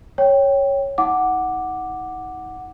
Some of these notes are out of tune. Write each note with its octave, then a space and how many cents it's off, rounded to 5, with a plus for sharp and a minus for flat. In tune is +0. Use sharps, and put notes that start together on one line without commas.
C#5 +0 G5 +0
D#4 +40 F#5 +0 D6 +0